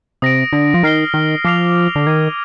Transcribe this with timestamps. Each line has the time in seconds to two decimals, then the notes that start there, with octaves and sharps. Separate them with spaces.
0.22 C3 D#6 A#6 D7
0.53 D3
0.74 F3
0.83 D#3 F6 C7 G7
1.14 D#3
1.45 F3 D6 F6 C7 F7
1.95 D3
2.06 D#3 D#6 G#6 C7 D#7